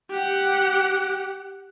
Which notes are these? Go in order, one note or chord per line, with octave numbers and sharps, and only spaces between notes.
G4 F#5